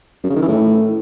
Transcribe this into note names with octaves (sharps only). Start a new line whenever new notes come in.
F#2
C#3
D#3
E3
A2